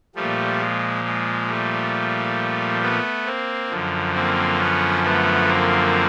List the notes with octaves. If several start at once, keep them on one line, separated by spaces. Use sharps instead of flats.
A#2 F3 G3 A3
G#3
G#3
G3 A3
A3 B3
A#3 C4
F#2 D3 F3
A#3 C4
B3 C#4
A3 B3
A#3 C4